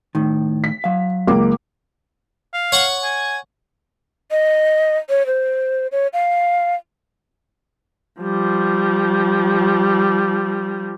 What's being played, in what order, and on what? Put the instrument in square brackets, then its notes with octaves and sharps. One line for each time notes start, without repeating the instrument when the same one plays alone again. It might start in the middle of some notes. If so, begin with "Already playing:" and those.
[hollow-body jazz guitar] A2 D#3
[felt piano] B6
[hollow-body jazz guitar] F#3 F5
[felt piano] C#2 A#3 D6
[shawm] F5
[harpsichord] C#5 F#5 C#6
[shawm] G#5
[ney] D#5
C#5
C5
C#5
F5
[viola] F3 G3